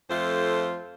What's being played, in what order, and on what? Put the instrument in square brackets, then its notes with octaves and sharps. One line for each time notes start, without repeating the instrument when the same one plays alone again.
[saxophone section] F2 A3 F4 A4 C5